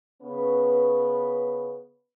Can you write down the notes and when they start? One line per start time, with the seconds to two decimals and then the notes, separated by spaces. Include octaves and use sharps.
0.22 C#3 B3 C#4 B4